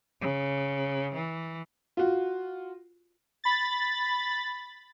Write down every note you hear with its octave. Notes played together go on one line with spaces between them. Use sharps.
C#3
E3
F4 F#4
B5 A6